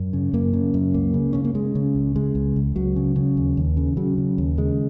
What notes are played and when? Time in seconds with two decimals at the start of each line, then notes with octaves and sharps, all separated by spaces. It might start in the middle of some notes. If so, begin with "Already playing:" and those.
Already playing: F#2
0.13 C#3
0.33 F#2 A#3
0.53 C#3
0.74 F#2
0.94 C#2 A#3
1.14 C#3
1.33 C#3 C#4
1.44 A#3
1.54 C#3 G#3
1.75 C#3
1.95 C#2
2.16 C#3 G#3
2.35 C#2
2.56 C#2
2.76 C#2 F#3
2.96 C#3
3.16 C#3
3.37 D#2
3.57 D#2
3.77 C#3
3.97 C#3 F#3
4.18 C#3
4.38 D#2
4.58 C#3 G#3